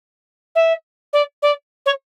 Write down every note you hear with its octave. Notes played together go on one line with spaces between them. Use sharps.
E5
D5
D5
C#5